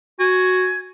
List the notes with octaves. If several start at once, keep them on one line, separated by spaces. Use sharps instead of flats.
F#4 G#5